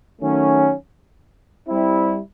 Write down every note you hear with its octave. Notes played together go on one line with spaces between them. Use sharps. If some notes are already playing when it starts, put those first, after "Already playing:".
D#3 F#3 A3 C#4
G3 C4 E4